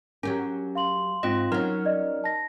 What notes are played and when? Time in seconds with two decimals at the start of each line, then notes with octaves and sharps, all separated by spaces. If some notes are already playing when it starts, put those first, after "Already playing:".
0.23 F#3 C#4 G4 A#4
0.75 F5 C6 F#7
1.23 G#2 C4 F4 D#5
1.52 F#3 C#4 D#4 A#4
1.85 D5 D#5
2.24 A5 A#6